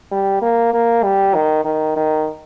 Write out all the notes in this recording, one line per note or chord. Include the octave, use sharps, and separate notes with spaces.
G3
A#3
A#3
G3
D#3
D#3
D#3